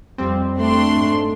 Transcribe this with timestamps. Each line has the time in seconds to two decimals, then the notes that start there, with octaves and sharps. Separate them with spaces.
0.18 F2 G3 C4
0.59 A3 D4 C6
0.97 G#2